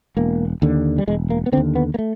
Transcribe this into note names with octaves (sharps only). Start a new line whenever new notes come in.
E1 A#3
D#2 D3
G3
E1 G#3
A#3
B3
D#2 D3 C4
B3
A#3
A3